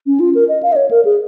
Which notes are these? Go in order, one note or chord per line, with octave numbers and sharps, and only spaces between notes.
C#4
F4
A#4
D#5
F5
D#5
C#5
A#4
G#4